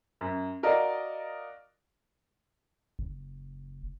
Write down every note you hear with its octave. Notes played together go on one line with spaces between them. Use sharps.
F#2
F#4 A#4 D5 D#5 F5
F#1